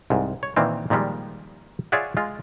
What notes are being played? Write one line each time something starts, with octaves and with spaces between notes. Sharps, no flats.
C2 G#2
C#5
A#2 D#3 E3 C4
A#2 D#3 F3 G3 G#3
F4 G#4 C#5 D5 E5 F#5
G#3 F4